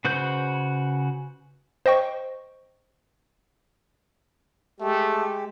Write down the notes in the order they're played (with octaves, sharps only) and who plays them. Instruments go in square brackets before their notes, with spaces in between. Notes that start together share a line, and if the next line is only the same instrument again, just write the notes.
[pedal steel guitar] C#3 F#4 B4 C5 G6
[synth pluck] C5 D#5 G5 C#6
[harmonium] G#3 G4 [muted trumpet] A3